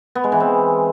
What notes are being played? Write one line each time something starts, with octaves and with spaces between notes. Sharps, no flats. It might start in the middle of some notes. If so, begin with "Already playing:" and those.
B3
G#3
E3
C4